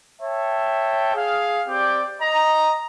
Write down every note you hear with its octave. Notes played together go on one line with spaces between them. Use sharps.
C#5 E5 G5 A5
G#4 F5
C4 G4 D5 G5
D#5 A#5